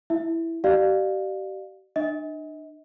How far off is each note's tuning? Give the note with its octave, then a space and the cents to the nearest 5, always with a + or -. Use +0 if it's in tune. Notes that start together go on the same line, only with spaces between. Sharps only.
E4 +0 E5 +0
G4 -40 D5 +30 F5 +0
D4 +40 D#5 +40